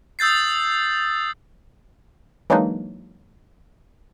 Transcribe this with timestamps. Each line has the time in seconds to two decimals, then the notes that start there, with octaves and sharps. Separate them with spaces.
0.19 D#6 E6 G6 A6 C7
2.50 E3 F#3 G#3 A#3 D4 D#4